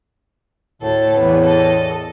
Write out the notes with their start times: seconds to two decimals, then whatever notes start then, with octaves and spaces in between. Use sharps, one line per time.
0.82 D2 A2 A4
1.17 E2 B3
1.46 A4 D#5